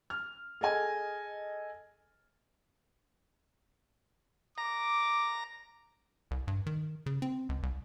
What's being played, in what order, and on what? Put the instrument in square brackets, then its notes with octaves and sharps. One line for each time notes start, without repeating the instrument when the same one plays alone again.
[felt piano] F6
G#4 A4 D#5 G#5
[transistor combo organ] A#5 [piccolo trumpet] D6
[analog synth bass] C2
G2
D#3
C#3
C4
C#2
C2